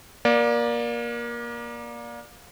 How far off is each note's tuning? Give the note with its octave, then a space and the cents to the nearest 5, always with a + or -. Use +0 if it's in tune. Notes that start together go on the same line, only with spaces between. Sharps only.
A#3 +25 D5 +0